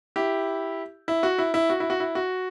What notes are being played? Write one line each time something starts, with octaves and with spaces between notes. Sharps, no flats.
E4 G4
E4
F#4
E4
E4
F#4
E4
F#4
E4
F#4